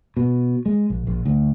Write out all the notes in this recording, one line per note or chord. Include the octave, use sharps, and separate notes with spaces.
B2
G#3
A#1
A#1
D2